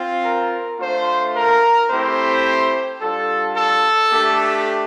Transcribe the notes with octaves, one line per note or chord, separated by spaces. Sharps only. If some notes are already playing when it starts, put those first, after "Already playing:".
Already playing: C4 F4
A#4
A3 D4 F4 C5
A#4
A3 C4 E4 G4 C5
G3 D4 F4 A4
A4
A3 D4 G4